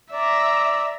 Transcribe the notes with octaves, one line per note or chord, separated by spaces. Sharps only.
D5 E5 A#5